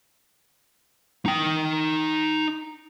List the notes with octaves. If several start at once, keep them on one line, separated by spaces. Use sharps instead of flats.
D#4 G5